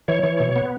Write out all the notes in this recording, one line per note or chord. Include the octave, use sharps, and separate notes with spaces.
E3 C#5
E3
B2
B3